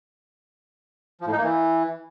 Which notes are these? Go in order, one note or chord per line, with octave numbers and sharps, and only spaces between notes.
F3
A2
D#4
A#3
E3